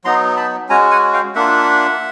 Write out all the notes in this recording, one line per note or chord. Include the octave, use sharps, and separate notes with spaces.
F#3 B3 D#4 A#5 C6
A5 B5
G#3 C#4 F#4 G#5 A#5
F#5 G#5
F5 G5
A#3 D4 F4 E5 F#5